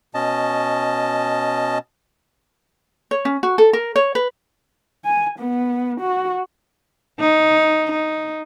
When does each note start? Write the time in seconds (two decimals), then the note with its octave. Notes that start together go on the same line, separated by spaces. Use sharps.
0.14 B2 C#4 D#5 A5
3.11 C#5
3.25 C#4
3.43 F#4
3.58 A4
3.73 A#4
3.96 C#5
4.15 B4
5.05 G#5
5.39 B3
6.00 F#4
7.20 D#4
7.92 D#4